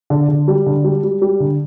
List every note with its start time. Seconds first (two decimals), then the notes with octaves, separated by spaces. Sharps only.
0.10 D3
0.29 D3
0.48 G3
0.66 D3
0.84 G3
1.03 G3
1.22 G3
1.40 D3